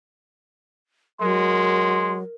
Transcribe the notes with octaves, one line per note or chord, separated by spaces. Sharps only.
F#3 G#3 A#4 C6